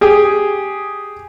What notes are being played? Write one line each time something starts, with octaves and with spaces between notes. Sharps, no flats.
G4 G#4